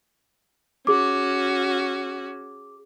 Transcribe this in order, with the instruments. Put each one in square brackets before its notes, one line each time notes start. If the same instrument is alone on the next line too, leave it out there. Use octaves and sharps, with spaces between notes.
[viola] C#4 F#4 [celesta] G#4 D6